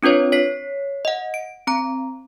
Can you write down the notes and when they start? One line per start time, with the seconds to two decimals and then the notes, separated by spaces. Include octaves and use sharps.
0.03 C4 D4 F4 B4 C#5
0.32 C#5 B6 C7
1.05 D#5 F#5
1.34 D7
1.67 C4 A#5